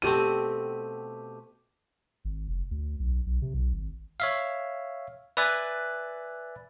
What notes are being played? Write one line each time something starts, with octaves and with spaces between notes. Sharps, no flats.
B2 A3 C4 G4 D#7
G#1
F1
D2
B1
B1
C3
B1
G#1
C#5 E5 F5
B4 D5 E5 G#5 F#6 A6